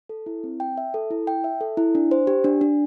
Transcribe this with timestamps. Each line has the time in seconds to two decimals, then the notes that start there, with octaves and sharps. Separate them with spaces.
0.09 A4
0.26 E4
0.44 C4
0.60 G5
0.78 E5
0.94 A4
1.11 E4
1.27 G5
1.44 E5
1.61 A4
1.77 E4
1.95 D4
2.11 C5
2.27 G4
2.44 D4
2.61 D4